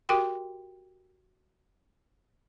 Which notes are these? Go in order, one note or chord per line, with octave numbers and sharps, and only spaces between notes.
F#4 G4 A#4 G5 C6